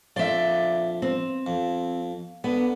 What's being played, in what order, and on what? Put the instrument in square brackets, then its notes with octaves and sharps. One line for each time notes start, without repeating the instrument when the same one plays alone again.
[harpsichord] A#1 F2 C6 [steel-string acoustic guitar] D5 E5
[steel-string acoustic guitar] C4
[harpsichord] F2
[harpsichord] D3 [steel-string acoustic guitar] B3